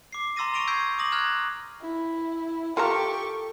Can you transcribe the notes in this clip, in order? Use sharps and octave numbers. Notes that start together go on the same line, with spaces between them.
D6 C7
A#5 C6 E6 A6 A#6 D#7
C#6 A#6 D7 D#7 F7 G7
E6 G6 G#6 B6 C7 D7
D6 D#6 A#6 F#7
A#5 F6 F#6 G#6
E4
F4 G4 A4 A#4 A#5 C#6